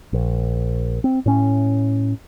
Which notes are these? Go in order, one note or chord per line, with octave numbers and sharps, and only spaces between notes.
A#1
C4
A2 C#4